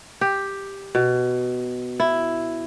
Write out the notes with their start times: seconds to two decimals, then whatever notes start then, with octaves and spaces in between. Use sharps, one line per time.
0.21 G4
0.95 B2
2.00 E4